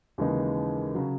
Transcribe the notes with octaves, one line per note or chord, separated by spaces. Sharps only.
D#2 C#3 E3 G#3 D#4
C#3 F#3